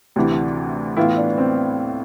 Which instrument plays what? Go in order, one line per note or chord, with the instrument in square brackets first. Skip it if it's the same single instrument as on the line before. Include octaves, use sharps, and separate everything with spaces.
[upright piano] D2 C3 E3
[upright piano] A2 E3 B3 F4 [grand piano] E4
[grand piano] D4
C4